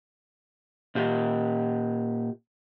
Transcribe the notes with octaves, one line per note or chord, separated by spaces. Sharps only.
A#2 G4